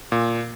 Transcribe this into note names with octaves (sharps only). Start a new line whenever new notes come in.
A#2